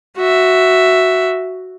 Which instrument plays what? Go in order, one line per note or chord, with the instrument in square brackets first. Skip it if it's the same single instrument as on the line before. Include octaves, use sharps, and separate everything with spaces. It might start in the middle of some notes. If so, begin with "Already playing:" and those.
[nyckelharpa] F#4 E5